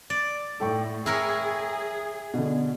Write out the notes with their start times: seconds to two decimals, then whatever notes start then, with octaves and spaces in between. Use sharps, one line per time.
0.10 D5
0.60 A2 A4 G5 C#6
1.06 E4 G#4 A#4 C#5
2.34 B2 D3